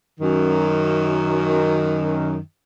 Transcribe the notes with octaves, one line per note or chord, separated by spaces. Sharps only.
F#2 D#3